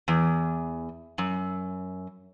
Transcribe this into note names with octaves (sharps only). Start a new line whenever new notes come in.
E2
F#2